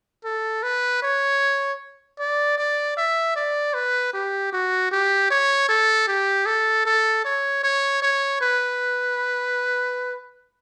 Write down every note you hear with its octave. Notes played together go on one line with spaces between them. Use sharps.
A4
B4
C#5
D5
D5
E5
D5
B4
G4
F#4
G4
C#5
A4
G4
A4
A4
C#5
C#5
C#5
B4